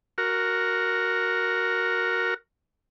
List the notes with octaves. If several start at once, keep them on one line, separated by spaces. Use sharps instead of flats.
F#4 A#4